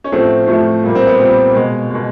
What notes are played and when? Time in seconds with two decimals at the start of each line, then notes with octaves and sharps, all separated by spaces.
0.04 C#4
0.12 A2 F3 A3 C4
0.47 A2 F3 A3
0.83 A#2 G3 A#3
0.95 C4
1.07 B3
1.19 A#2 G3 A#3 C4
1.55 B2 G#3
1.90 B2 G#3